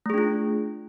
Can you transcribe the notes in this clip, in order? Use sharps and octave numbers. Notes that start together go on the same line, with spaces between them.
A3 D4 F4 G#4